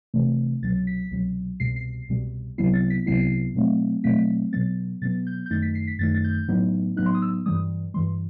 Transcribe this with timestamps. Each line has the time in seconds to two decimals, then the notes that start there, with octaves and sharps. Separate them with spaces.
0.14 C3 E3 A3
0.63 C2 B2 F#3 A6
0.87 B6
1.11 C2 B2 F#3
1.60 C2 B2 G3 C7
1.76 C7
2.09 C2 B2 G3
2.58 C2 C3 F#3 B3 E4 C7
2.74 A6
2.90 B6
3.06 C2 C3 F#3 B3 E4 C7
3.55 B2 F#3 A3 C4
4.04 B2 F#3 A3 C4 B6
4.53 B2 F#3 B3 A6
5.02 B2 F#3 B3 A6
5.27 G6
5.46 G6
5.51 F#2 D#3 A3 D#4 A6
5.62 B6
5.75 C7
5.87 B6
5.99 F#2 D#3 A3 D#4 A6
6.14 A6
6.24 G6
6.48 A2 F#3 B3 D#4
6.97 A2 F#3 B3 D#4 F#6
7.06 C6
7.15 D#6
7.22 E6
7.46 G2 E3 G3 D#6
7.94 G2 E3 G3 C6